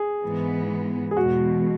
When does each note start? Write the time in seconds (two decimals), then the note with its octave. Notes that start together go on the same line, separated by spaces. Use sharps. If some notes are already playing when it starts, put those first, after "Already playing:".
Already playing: G#4
0.23 G#2 E3 G#3 B3
1.11 G#4
1.17 E2 B2 G#3 F#4